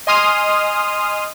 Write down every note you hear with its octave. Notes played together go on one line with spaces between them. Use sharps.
D#5 G#5 C6 D#6 F6